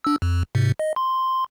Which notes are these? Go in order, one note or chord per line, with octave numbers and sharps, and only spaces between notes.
D4 E6
F2
G#2 C3
D#5
C6